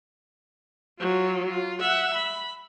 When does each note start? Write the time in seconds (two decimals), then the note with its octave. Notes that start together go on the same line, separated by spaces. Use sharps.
1.00 F#3 F4
1.50 F4
1.81 E5 F#5
2.15 B5